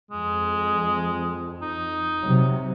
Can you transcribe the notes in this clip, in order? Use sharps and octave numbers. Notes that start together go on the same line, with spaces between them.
F2 G#3
D#4
C3 F#3